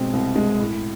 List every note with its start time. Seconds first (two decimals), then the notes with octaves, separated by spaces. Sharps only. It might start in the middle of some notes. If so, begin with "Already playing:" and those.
Already playing: B2 G#3 C4
0.13 C2
0.36 G#3
0.59 A2